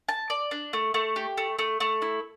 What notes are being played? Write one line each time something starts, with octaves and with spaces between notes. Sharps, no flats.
A5
D5
D4
A3
A3
G4
A3
A3
A3
E4